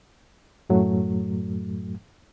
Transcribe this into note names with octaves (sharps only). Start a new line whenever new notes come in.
F#2 A2 F#3 A3